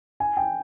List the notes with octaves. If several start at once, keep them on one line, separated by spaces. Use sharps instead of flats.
G#5
G5